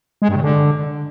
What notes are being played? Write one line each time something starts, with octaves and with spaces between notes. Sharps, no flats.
G#3
G2
C#3
D3